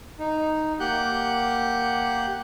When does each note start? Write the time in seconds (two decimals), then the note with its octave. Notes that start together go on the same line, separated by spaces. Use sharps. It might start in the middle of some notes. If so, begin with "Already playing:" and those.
0.19 D#4
0.80 A#3 G4 F#5 F#6 G6